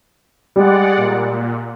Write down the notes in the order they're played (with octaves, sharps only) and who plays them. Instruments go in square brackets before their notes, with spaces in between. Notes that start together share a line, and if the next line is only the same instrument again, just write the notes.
[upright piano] G3 [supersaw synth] G#3 D5 F#5
[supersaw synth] A#2